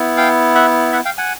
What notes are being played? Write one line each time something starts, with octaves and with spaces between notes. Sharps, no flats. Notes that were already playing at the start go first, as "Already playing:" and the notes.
Already playing: B3 E4
F5 G5
E5 F#5
E5 F#5
F5 G5
F#5 G#5